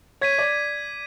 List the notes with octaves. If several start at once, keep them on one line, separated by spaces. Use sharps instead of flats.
C#5 G#6 B6 D#7
D5